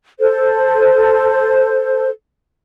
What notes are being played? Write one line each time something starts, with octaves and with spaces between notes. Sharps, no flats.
A4 C5